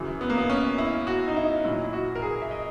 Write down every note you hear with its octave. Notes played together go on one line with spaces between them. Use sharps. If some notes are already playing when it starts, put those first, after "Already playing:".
Already playing: F#2 C#3 E3
B3
A#3
B3
C#4
E4
F#4
D#4
E4
A#2 F#3 E4
E4
F#4
A#4
G#4
E5
D#5